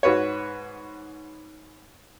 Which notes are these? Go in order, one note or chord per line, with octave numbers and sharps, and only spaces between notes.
G#2 F#4 B4 C#5